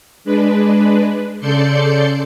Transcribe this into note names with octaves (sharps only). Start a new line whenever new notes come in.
G#3 D4 B4
C#3 A4 D5 C6 G6 C#7